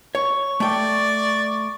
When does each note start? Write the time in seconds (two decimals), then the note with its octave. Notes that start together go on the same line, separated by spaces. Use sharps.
0.15 C#5 C#6
0.60 A3 D5 G5